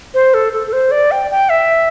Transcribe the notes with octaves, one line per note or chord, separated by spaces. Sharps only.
C5
A4
A4
A4
C5
D5
G5
G5
E5